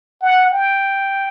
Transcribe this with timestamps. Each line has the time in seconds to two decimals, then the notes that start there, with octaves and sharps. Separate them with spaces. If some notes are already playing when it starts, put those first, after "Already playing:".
0.22 F#5
0.52 G5